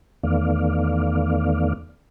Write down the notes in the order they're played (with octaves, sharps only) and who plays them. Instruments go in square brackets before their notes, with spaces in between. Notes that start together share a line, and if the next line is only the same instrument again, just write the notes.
[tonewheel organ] E2 D#3 A3 B3 D5 F5